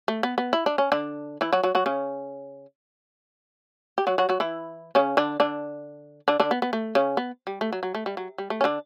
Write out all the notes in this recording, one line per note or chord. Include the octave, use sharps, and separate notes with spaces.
A3
B3
B3
E4
D4
C#4
D3 D4
E3 E4
F#3 F#4
F#3 F#4
F#3 F#4
C#3 C#4
G4
F#3 F#4
F#3 F#4
F#3 F#4
E3 E4
C#3 C#4
D3 D4
D3 D4
D3 D4
D3 D4
B3
B3
A3
C#3 C#4
B3
G3
A3
F#3
F#3
A3
G3
F#3
G3
A3
C#4
D3 D4